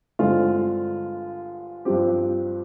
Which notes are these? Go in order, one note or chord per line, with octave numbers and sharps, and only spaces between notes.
G2 D3 G#3 C4 F4
G2 F3 C4 G4